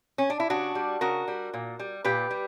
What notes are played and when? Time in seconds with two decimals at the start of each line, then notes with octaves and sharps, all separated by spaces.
0.18 C#4
0.30 D4
0.40 E4
0.50 C#3 D4 F#4
0.75 G3
1.01 C#3 F#4 A#4
1.28 G3
1.54 A#2
1.79 G3
2.04 A#2 G4 B4
2.31 G3